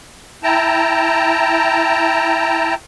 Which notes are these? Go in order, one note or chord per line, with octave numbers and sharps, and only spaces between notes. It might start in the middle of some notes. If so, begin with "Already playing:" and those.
E4 G5 A5 A#5